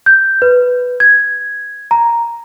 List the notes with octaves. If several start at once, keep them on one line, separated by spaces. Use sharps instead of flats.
G6
B4
G#6
A#5